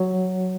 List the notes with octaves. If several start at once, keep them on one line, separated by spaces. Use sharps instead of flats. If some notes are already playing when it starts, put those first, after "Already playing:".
Already playing: F#3